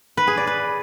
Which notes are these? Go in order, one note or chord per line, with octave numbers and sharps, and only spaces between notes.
B4
G#4
D5
B4